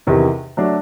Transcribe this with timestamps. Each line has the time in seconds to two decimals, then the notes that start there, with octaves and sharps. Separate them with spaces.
0.07 E2 C3 D#3
0.57 F#3 A3 D4